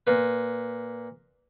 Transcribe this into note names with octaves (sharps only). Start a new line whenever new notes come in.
A#2 B4